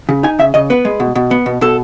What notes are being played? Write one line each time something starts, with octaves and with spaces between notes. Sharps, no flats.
C#3
D#4 G#5
C#3 E5
C#3 D#5
B3 B4
G#3
B2
B2
B3
B2
B2 A4